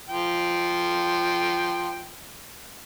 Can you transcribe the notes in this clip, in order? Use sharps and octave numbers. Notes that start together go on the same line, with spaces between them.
F3 G5